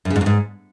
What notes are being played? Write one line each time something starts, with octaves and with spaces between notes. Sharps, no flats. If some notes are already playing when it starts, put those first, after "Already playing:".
F#2
C#3
G#2
F2
G#2